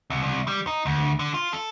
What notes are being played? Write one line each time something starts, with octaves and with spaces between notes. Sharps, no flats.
C2
C2
G3
D#4
D2
D3
F4
A4